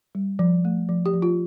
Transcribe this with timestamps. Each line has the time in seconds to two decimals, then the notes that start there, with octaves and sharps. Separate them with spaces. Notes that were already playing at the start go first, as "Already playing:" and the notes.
0.15 G3
0.39 F3
0.65 A3
0.89 F3
1.06 G4
1.13 F3
1.22 F4